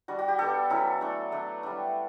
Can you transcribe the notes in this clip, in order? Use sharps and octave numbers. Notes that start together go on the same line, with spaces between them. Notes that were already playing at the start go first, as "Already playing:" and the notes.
G3 D4 F#4
F#4
G4
G3 B3 D4 A4
F#3 C#4 E4 A4
A3 D4
A3 D4
G3 D4